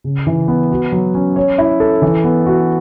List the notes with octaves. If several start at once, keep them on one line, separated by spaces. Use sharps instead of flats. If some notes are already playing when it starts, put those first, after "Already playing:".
C#3
E3
B3
F#4
F#3
C#4
C#5
E4
A4
E3
B3
F#4